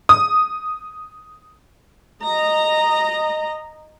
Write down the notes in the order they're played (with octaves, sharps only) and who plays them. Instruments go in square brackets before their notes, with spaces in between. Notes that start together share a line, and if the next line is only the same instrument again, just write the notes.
[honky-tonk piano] D#6
[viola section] D#5 A#5